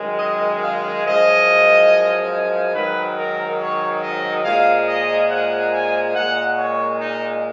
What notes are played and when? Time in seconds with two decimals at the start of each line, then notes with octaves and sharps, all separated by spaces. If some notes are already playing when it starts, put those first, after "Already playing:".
Already playing: F#2 D#3 G#3
0.19 D#5
0.62 F5
1.03 F#2 F3 G#3 D#5
2.73 G#2 D#3 F#3 B4
3.17 A#4
3.59 C#5
4.02 D#5
4.44 A#2 F3 G#3 F5
4.87 D#5
5.29 F#5
5.71 G#5
6.14 A#2 G#3 F#5
6.57 C#5
6.99 D#4